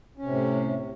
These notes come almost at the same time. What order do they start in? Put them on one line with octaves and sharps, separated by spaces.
C#4 C3 A2